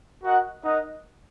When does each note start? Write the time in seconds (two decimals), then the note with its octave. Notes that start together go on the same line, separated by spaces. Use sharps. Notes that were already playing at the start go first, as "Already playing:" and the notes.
0.24 F#4 A#4 D#5 F#5
0.64 D#4 A#4 D#5 F#5